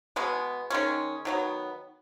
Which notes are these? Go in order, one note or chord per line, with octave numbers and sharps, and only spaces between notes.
B2 G#3 B3
D#3 G#3 C#4
D#3 F#3 B3